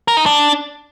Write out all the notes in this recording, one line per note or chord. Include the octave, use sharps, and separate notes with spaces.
A#4
D#4
D4